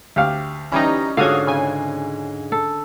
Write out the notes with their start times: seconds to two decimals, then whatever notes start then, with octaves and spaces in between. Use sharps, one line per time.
0.16 D2 G4 F5
0.72 E3 G3 C#4 D#4 A#5
1.17 G#2 D3 C#4 F4 F#4 F5 D#6 G#6
1.47 C#3 G#5
2.52 A4